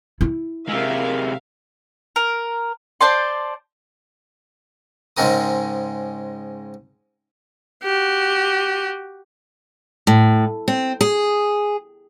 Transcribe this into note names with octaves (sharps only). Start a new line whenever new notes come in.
E4
C3 G#3 A#4 E5 F5
A#4
C5 D5 A5 C6
G#2 C#3 G#3 C4 A#4 D#6
F#4 G4
A2
C4
G#4